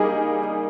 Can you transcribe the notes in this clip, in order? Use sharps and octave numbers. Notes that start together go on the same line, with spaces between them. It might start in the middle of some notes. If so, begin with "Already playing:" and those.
Already playing: G3 A#3 D#4 G#4